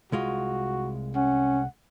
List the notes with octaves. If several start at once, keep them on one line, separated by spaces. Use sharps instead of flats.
C2 G#3 F4 F#4
C#4 F#5